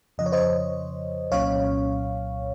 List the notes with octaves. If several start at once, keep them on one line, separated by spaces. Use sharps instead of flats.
F2 C#3 F3 D#5
C#5
C5 D#5
C2 A#2 F#3 C#4 C#5 F5